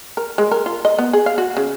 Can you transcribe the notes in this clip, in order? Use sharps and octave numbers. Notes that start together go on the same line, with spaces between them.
A#4
G#3
A#4
F4
D#5
B3
G#4
F5
F#4
C#3